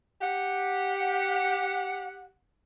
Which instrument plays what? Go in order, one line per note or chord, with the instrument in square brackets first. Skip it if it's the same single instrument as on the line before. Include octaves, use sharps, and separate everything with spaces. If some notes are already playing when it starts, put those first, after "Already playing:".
[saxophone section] G4 F#5